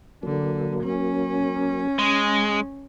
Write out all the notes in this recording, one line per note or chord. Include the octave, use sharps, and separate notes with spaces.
D3 F#3 A#3
C#4
G#3